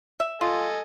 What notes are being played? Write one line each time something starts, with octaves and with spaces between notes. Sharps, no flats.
E5
F4 A4 D#5 G#5